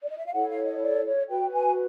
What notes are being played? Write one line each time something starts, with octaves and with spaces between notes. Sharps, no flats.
D5
D#5
E5
F5
E4 A4 C#5 F#5
F5
D#5
D5
C#5
F#4 B4 G5
G#5